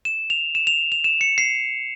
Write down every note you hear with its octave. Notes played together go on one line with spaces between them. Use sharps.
E7
F7
E7
F7
F7
E7
C#7
C7